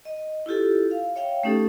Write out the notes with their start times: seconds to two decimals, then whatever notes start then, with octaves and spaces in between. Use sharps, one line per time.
0.05 D#5
0.46 E4 F4 G4 A4
0.91 F5
1.16 C#5 E5 F5 G5
1.43 A3 C#4 D#4 G4 A4